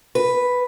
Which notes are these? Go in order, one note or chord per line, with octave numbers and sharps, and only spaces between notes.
B4